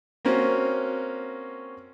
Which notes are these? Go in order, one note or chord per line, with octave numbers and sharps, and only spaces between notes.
A#3 C4 C#4 F#4